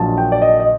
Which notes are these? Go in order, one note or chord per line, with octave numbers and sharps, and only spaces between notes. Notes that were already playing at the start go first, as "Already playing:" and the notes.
Already playing: A#1 A#2 F#3 A5
G5
D5
D#5
D#5